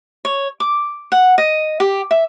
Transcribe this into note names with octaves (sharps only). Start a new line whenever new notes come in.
C#5
D6
F#5
D#5
G4
E5